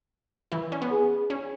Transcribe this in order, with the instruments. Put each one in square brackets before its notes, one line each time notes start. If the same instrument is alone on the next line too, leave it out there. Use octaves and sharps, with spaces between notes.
[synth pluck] E3 E4
C#4
B3
[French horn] G#4
[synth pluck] C#4